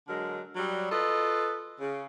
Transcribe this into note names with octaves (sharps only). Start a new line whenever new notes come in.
D3 F#3 G#3 A#4
F#3 G3
F4 A4 B4 D#5
C#3